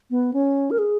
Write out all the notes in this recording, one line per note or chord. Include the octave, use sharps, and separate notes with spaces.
B3
C#4
A#4
G#4